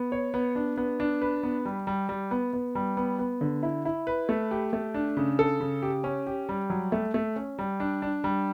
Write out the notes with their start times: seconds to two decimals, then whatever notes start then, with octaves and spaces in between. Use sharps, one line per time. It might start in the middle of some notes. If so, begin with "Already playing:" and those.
Already playing: B3
0.12 C#5
0.34 B3
0.55 D4
0.78 B3
1.00 D4
1.22 B4
1.43 B3
1.65 G3
1.87 G3
2.09 G3
2.31 B3
2.53 B3
2.75 G3
2.97 B3
3.19 B3
3.41 D3
3.63 E4
3.85 E4
4.07 B4
4.29 A3
4.51 G4
4.73 A3
4.94 D4
5.17 C#3
5.39 A4
5.60 C#3
5.83 G4
6.04 C#4
6.27 G4
6.49 G3
6.70 F#3
6.92 A3
7.14 A3
7.36 C#4
7.59 G3
7.80 D4
8.02 D4
8.24 G3